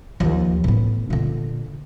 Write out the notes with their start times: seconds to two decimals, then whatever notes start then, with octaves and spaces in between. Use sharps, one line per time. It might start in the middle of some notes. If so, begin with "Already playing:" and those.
0.20 D#2 F3
0.64 A2 B3
1.10 A#2 D3